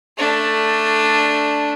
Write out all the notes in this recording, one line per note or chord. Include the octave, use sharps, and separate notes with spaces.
A3 D4